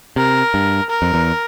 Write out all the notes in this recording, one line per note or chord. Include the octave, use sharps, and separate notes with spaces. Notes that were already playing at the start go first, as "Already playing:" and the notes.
C3 A#4
G2
A#4
F2
E2